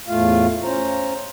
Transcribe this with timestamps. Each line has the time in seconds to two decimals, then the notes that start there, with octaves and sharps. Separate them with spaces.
0.08 E2 A2 A3 F4 F5
0.63 C#4 C5 A#5